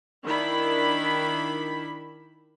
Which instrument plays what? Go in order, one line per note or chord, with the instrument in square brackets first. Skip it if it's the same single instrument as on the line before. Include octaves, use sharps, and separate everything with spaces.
[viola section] D#3 D4 E4 B5